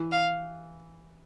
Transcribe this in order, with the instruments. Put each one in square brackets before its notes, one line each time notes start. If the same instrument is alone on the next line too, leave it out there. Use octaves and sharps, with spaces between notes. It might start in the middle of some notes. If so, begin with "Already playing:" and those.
Already playing: [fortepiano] E3
[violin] F5